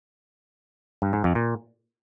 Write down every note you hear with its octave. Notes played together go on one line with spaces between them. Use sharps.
G2
G#2
F2
A#2